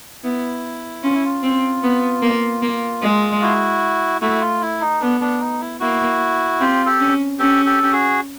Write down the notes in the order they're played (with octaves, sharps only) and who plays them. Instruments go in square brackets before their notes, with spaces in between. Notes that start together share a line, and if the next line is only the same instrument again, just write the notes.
[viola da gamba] B3 [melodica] E4
[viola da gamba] C#4 [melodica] F4
[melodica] E4
F4
[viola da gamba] C4
B3
A#3
A#3
G#3
[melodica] E4 F#4
[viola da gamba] A3 [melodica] E4 F#4
[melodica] F4
E4
D#4
[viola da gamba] B3 [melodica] D4
[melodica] D4
D#4
E4
[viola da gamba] A#3 [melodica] E4 F#4
[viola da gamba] C4 [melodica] F4 G4
[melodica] G4 A4
[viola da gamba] C#4
[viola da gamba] C#4 [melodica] G4 A4
[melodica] G4 A4
G4
F#4 G#4